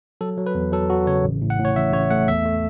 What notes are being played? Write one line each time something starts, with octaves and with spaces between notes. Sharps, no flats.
F#3 A4
F#3
B4
E2
F#3 A4
F#3 F#4
C#3 C#5
A1
A2
F#5
A2
C#5
A1 E5
A1 C#5
A3 F#5
E2 E5
A3